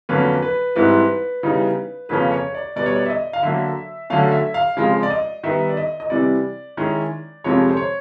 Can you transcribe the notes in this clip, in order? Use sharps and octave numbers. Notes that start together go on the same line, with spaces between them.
F2 D3 F#3 A#3 C#4 B4
B4
G#2 E3 G3 C4 E4 B4
C#3 E3 G3 B3 D#4
F2 C#3 F3 A#3 C#4 B4
C#5
D5
B2 G3 B3 D5
C#5
D5
E5
D#5
F5
D3 F#3 A#3 E5
D3 F#3 A3 C#4 F5
E5
F5
C#3 F3 G#3 C4 F5
D5
D#5
D#3 G3 B3 E5
D5
D#5
D#5
C3 E3 G3 D5
D#3 G#3 C#4 E4
F2 C3 F3 G#3 C#5
C5
C#5